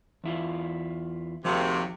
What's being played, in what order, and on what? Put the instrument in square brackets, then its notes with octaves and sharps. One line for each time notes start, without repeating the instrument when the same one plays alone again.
[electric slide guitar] E2 E4 F4
[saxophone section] D#2 C3 [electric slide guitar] F3 F#4 G#4